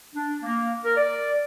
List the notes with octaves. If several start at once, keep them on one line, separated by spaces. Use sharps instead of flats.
D4
A#3
A#4
D5